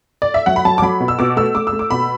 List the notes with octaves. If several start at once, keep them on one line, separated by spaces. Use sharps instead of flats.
D5
E5
F#3 F#5
B5
F#3 A5
D6
F#3 B5
B2
E6
B2 D6
A3 E6
A3 D6
E6
A3
D6
B2 B5